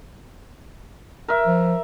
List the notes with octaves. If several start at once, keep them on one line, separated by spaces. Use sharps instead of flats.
A#4 E5
F3